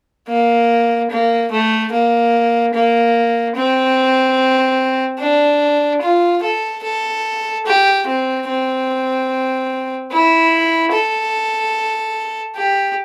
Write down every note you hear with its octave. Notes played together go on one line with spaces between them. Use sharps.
A#3
A#3
A3
A#3
A#3
C4
D4
F4
A4
A4
G4
C4
C4
E4
A4
G4